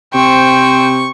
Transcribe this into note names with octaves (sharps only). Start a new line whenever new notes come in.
C3 C5 G5 C#6